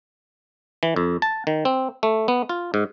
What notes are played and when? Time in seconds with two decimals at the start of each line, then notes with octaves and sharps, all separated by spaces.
0.83 E3
0.96 F2
1.22 A5
1.47 D#3
1.65 C4
2.03 A3
2.28 B3
2.49 F4
2.74 G#2